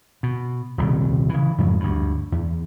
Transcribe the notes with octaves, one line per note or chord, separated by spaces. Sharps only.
B2
D#1 C2 C#3
C#3 E3
F2 G#2 F3 F#3
D2 G2
E2